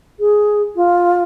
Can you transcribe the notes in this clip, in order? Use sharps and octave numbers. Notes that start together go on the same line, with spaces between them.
G#4
F4